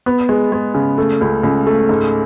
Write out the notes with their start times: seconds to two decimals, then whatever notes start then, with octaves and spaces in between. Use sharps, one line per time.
0.06 B3
0.29 G#3
0.52 G#3
0.74 C#3
0.98 A3
1.21 C#2
1.43 C#2
1.67 A3
1.89 G#2